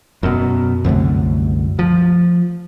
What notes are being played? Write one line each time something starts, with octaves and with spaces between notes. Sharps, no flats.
F#2 B2
C2 F#2 D3 A3
F3